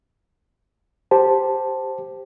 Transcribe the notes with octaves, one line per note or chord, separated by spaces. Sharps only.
G4 C5 A5